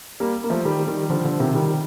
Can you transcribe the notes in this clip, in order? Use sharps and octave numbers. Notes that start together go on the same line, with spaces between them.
G3 A#3
A#3
F3 A3
D#3 G3
D#3 G3
D3 F3
D3 F3
C3 D#3
D#3 G3